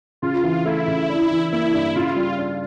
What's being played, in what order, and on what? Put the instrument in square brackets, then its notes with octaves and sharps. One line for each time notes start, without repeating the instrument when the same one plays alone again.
[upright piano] C#3 [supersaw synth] F4
[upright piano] E3
[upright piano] A3 [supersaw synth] E4
[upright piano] C#3
D4
E3
[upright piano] A#3 [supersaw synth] E4
[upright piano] G2
[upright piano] C#3 [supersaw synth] F4
[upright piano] G3
D4